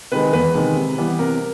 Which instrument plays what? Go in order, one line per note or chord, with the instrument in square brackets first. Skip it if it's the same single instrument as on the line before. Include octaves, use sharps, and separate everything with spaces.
[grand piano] C3 D#3 G#3 [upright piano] B4
[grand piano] E2 [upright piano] B4
[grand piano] C3 D#3 G#3
C3
E3 G3 B3
[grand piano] C3 [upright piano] A#4